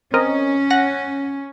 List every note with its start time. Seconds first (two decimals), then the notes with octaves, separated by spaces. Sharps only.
0.14 C4 C#4 A#4 D#5
0.70 F#5 A#6